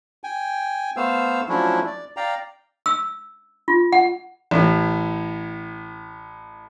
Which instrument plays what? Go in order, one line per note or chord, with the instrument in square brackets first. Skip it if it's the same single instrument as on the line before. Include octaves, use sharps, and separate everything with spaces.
[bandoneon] G5 G#5
A3 B3 C5 F5 E6
F3 F#3 A3 C#4 D4 E4
D5
D5 F5 G5 A#5
[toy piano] E6
F4
F#5
[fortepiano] A1 A2